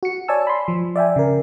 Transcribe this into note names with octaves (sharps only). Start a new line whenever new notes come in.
F#4 C#7
C#5 D5 G#5 A5 E6
B5 C6
F3
D5 E5 G5 G#5
C#3 A#4